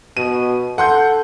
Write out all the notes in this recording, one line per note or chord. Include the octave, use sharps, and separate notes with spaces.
B2 D#7
A4 F#5 C6 G6